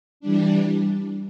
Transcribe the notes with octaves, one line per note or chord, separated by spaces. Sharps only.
E3 G3 D4